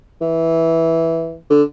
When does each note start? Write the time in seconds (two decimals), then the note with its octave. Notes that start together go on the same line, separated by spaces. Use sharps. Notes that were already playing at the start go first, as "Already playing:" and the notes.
0.21 E3
1.50 D3